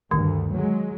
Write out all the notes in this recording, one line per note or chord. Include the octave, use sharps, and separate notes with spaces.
D2 G2 D#3
F#3 G#3